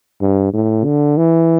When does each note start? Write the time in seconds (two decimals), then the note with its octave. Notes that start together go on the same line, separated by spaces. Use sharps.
0.22 G2
0.53 A2
0.85 D3
1.17 E3